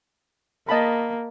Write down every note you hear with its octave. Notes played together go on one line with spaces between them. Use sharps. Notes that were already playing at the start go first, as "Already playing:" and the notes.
A#3 D#5 A5 B5